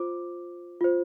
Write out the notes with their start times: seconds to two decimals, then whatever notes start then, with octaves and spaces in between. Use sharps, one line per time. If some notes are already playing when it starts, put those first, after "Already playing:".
Already playing: F4 C5 D6
0.81 F4 C5